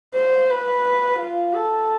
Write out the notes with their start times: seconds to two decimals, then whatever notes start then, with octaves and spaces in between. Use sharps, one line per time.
0.15 C5
0.50 B4
1.19 F4
1.54 A4